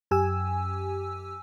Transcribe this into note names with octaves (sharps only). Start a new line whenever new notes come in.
F#2 G4 G#5 E6